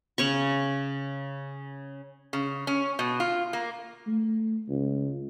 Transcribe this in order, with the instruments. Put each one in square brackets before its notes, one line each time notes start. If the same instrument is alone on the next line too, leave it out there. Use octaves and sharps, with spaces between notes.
[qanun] C#3 C#5 C#6
[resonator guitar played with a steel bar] C#3
C#4
B2
F4
A#3
[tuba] A3
C#2